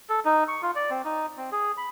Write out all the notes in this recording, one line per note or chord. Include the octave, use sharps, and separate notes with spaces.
A4
D#4
C#6
F4
D5
C4
D#4
C4
G#4
B5